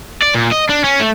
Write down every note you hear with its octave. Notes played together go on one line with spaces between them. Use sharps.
D5
A#2
D#5
D4
C#4
A3